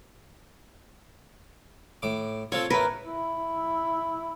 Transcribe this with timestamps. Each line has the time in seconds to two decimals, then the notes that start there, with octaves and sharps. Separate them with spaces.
2.02 A2 D6
2.52 C4 F4 A4 C#5
2.70 A2 A3 A#4 B4
3.08 E4